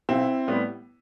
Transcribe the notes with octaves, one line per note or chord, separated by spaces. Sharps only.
B1 C4 E4
A2 G3 B3